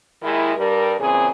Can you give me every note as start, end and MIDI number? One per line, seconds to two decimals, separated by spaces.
0.23 0.52 39
0.23 0.52 51
0.23 0.52 56
0.23 0.52 64
0.57 0.94 43
0.57 0.94 55
0.57 0.94 70
0.99 1.28 46
0.99 1.28 49
0.99 1.28 52
0.99 1.28 60
0.99 1.28 68